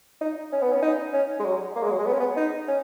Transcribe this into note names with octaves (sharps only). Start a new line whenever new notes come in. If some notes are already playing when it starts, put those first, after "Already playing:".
D#4
C#4
B3
C#4
D#4
C#4
G#3
F#3
A#3
G#3
F#3
G#3
B3
C#4
B3
D#4
C#4